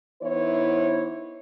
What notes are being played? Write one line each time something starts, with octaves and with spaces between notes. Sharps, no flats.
E3 B3 D#4 E4 C5 C#5